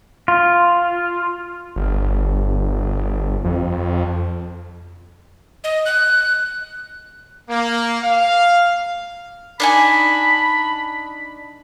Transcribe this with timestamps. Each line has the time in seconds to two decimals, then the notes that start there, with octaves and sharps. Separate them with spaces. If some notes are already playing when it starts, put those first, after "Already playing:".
0.28 F4
1.76 G1
3.45 F2
5.64 D#5
5.85 F#6
7.49 A#3
8.02 F5
9.60 D4 D#4 G#5 B5